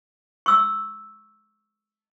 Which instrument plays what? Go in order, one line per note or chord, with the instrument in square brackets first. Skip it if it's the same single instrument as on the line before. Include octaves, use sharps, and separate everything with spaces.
[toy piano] C#6 E6